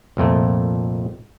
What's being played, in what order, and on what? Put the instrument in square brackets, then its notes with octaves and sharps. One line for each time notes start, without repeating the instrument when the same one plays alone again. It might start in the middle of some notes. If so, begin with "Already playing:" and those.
[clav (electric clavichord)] C2 F2 A#2 A3